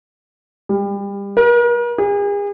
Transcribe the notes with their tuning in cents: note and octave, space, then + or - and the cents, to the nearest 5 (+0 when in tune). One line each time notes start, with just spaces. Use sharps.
G3 +30
A#4 +45
G#4 -40